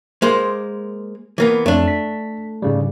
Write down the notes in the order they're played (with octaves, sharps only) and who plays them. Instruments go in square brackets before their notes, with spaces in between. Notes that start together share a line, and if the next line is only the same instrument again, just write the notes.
[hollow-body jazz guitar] G#3 A#3 C5
E3 A#3 B3
[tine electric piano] F2 [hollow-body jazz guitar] A3 D4
[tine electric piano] B6
G#2 C#3 G3